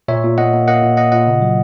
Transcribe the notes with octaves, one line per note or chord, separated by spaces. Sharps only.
A#2 C#5 E5
A#2
A#3 D#5 F#5
A#3
A#3 D#5 F#5
A#2
A#3 D#5 F#5
A#2 D#5 F#5
C#3
F#3